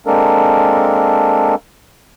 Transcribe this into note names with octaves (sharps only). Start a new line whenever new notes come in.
G#3 A#3 C4 D4 A4 A#4